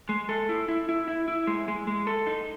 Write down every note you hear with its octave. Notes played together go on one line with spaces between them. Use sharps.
G#3
A4
E4
E4
E4
E4
E4
G#3
G#3
G#3
A4
D#4